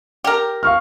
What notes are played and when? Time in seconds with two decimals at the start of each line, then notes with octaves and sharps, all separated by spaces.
0.24 G4 A#4
0.63 F5 C#6 F6